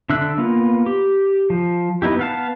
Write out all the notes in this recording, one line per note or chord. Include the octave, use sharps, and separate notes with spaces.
D3 D4 E5 E6 F#6
A#3 B3 F4
G4
F3
B3 D#4 E4 G4
B3 F5 A5